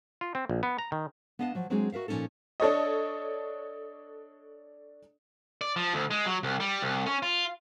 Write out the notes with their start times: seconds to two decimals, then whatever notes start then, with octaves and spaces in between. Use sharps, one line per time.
0.21 F4
0.35 C4
0.50 A#1
0.63 B3
0.79 A#5
0.92 D#3
1.39 B3 D4 D#5 F5 F#5 A5
1.55 F3 F#3
1.70 F#3 G#3 C4 D4 F#4 G#4
1.92 F#4 A#4 E5 F5
2.08 A#2 F3 G#3 C#4 D#4 A4
2.60 D4 A4 C#5 D#5
5.61 D5
5.76 F3
5.94 D2
6.11 G#3
6.26 F#3
6.43 C2
6.60 G3
6.82 C2
7.07 C#4
7.23 F4